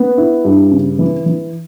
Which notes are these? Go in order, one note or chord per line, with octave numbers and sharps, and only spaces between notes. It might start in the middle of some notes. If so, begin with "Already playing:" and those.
Already playing: B3
E4
G2
C#3
E3
E3